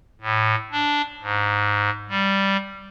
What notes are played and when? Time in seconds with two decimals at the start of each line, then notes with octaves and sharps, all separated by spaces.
0.21 A2
0.72 D4
1.21 G#2
2.09 G3